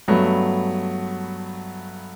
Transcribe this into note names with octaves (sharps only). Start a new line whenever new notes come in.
G2 F#3 A3 B3